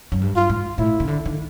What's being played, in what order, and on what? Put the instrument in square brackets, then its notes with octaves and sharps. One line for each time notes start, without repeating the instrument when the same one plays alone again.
[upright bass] F#2
G2
[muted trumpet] F4
[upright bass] G#2
[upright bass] A2 [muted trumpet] E4
[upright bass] C#3
D3
D#3